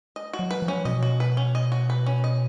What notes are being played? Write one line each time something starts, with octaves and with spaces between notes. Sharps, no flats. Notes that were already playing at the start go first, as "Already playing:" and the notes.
D#5
F#4
F#3
B4
F3
C#4
B2 D#5
F#4
B4
C#4
D#5
F#4
B4
C#4
D#5